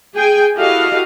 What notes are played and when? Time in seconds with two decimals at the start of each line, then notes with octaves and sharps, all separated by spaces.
0.15 G#4 G5 G#5
0.55 E4 F#4 G4 A4 D#5 F5